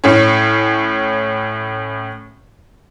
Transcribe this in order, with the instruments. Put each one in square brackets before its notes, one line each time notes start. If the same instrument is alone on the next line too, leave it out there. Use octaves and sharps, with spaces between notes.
[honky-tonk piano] A2 C#4